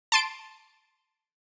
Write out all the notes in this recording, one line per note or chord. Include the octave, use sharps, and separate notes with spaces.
A5 C6 D7